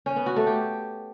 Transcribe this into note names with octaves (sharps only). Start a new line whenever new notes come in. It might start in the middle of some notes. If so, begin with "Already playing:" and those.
C#4
B3
F#4
A3
G4